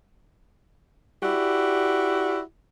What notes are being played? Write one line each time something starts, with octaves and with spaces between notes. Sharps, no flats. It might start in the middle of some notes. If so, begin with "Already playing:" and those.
E4 F#4 G4 D5